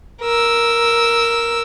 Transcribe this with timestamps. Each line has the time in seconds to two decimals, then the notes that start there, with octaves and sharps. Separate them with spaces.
0.22 A#4 E6